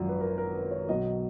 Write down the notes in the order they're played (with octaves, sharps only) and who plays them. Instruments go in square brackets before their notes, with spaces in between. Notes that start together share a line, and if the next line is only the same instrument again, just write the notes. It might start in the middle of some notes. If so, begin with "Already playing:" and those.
Already playing: [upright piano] G#1 F#2 F3
B4
A#4
A#4
B4
C#5
B1 B2 F#3 D#5